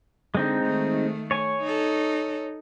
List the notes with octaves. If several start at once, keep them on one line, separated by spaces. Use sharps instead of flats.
D3 G#3 C4 D#4
D#3 A3
A3 C#5 G#5
D#4 A4